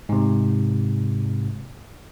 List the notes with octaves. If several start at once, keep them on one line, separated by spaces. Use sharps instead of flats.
G#2 C3